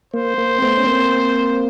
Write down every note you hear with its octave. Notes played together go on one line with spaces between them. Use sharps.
A#3 C5
A#3
C4
A3 B3
C#4
A#3 C4